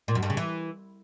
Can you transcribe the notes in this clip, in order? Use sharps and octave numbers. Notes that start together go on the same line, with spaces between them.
A#2
F#2
G2
C#3
E3